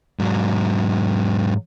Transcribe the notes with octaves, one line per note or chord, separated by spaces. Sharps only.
G#2 F#3